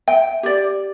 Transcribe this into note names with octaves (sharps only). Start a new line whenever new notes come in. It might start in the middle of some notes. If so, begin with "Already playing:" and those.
E5 G5
G4 D5